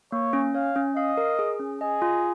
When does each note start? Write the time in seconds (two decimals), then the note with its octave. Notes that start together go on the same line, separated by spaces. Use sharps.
0.12 A#3 C#5
0.33 C#4
0.55 C#5 F5
0.76 C#4
0.96 D#5 F5
1.17 A#4
1.39 G#4
1.60 C#4
1.81 G#4 D#5
2.02 F4